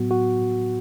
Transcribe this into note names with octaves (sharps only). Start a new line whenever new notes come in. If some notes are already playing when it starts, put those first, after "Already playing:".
Already playing: A2 F#3 B3 F#4
F#4